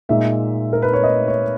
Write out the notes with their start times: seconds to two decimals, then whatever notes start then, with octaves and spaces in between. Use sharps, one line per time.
0.09 A#2 G#3 D#4 E5
0.73 A#4
0.82 B4
0.93 C#5
1.03 D#5
1.28 C#5